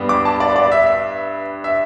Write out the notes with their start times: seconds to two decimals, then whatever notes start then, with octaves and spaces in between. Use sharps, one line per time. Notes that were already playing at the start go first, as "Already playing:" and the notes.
Already playing: G2 G3 B3
0.09 D6
0.25 A5
0.40 D5
0.56 D5
0.72 E5
0.86 E5
1.64 E5